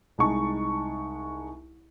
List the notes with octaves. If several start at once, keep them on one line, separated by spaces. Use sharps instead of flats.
C2 G#3 D#4 A5 C#6